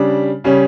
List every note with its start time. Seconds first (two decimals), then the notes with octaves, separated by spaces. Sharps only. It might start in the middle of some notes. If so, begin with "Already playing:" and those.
Already playing: C#3 G3 D4
0.44 C#3 G3 C#4